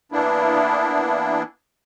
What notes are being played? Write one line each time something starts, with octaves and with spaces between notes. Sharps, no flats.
E3 A#3 B3 D4 E4